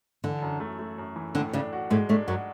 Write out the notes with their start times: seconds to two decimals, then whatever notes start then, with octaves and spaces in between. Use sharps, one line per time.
0.24 D3 E3 D4
0.42 F#2
0.60 A3
0.79 A3
0.98 F#2
1.16 E3
1.35 A2 D3 D4
1.53 C#3 C#4 D4
1.73 F#4
1.90 A2 G#3 A3
2.09 A2 A3 D4
2.27 F#2 F#3 F#4